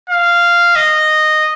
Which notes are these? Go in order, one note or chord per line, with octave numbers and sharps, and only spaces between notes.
F5
D#5